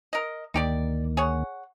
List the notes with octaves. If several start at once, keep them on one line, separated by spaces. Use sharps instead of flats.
A#4 D#5
D2 D#3 A#3 D#4 G4 D5
G#4 C#5 F#5